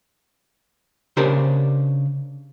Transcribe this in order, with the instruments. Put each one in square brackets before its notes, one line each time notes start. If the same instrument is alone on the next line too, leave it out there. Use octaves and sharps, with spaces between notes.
[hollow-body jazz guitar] C#3 D4 G4 A#4 C5